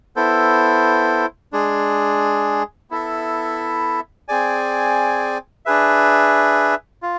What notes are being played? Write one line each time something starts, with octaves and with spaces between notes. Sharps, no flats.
B3 E4 A4 C5
G#3 D4 G#4
B3 E4 A4 E5
C4 G#4 D5 G#5
D4 G#4 B4 E5
F4